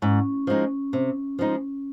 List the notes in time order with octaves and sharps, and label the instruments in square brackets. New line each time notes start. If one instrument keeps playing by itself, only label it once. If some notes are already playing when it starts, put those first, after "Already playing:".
[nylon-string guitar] G#2 [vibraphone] C#4
[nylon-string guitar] F3 G#3 D#4
C3
F3 G#3 D#4